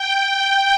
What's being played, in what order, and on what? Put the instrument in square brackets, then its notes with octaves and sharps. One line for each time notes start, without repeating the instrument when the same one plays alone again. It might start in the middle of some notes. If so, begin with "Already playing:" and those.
Already playing: [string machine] G5